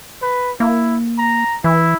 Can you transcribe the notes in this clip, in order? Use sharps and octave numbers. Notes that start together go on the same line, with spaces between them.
B4
A#3 E4
A#5
E3 E4